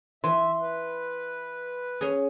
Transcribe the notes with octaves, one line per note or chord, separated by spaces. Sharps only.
E3 E5 C6
B4
C#4 G#4